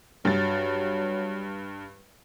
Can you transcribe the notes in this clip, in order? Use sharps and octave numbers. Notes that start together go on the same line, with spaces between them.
G2 F#3 A6